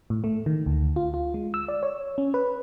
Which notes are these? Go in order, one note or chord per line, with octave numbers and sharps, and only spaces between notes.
A2
A3
D#3
D2
F4
F4
G#3
E6
D5
C#5
C#4
B4